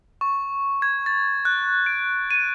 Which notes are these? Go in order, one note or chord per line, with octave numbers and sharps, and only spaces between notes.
C#6
G#6
A6
F#6
D7
D#7